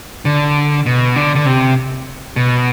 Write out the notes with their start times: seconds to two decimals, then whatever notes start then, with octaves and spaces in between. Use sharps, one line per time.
0.25 D3
0.86 B2
1.16 D3
1.35 D3
1.46 C3
2.36 B2